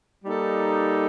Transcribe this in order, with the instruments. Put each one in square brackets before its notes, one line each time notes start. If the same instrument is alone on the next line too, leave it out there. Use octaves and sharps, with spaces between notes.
[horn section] G3 A#3 D#4 A4